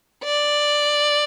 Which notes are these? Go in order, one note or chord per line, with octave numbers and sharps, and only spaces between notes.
D5